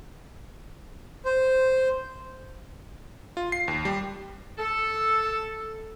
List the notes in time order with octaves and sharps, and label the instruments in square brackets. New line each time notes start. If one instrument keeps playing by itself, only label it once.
[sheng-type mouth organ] C5
[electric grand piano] F4
C7
D#2
G3
[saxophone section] A4